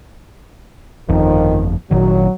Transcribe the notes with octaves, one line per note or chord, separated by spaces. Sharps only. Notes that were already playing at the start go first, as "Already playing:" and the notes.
G1 F2 D#3 F3
G#1 A#2 D#3 F#3